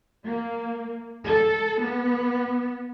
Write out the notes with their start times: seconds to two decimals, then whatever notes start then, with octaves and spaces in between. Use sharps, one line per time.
0.23 A#3
1.25 A4
1.81 B3